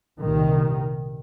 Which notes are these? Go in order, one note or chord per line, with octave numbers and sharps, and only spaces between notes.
C2 A#2 D#3